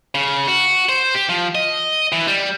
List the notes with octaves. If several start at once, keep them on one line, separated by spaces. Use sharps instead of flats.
C#3
F#4
C5
G4
F3
D#5
E3
G3